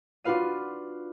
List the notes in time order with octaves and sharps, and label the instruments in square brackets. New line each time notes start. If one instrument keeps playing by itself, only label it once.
[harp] D4 F4 F#4 B4 F5 D#7